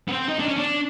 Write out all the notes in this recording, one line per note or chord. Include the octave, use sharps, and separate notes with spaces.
B3
C4
D#4
D4
C#4
D4